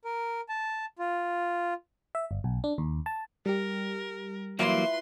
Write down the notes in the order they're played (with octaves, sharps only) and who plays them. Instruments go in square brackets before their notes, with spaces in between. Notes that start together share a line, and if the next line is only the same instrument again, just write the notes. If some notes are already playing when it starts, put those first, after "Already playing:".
[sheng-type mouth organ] A#4
A5
F4
[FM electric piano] E5
G1
B1
D4
D#2
A5
[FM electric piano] G3 G4 [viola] A#4
[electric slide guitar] E3 F#3 A#3 [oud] E4 F4 [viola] B4 C6